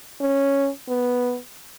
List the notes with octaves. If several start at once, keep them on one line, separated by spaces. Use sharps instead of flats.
C#4
B3